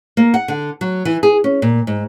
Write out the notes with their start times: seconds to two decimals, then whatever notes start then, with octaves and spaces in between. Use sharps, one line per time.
0.17 A#3
0.34 F#5
0.48 D3
0.81 F#3
1.05 E3
1.23 G#4
1.44 C#4
1.62 A#2
1.87 G#2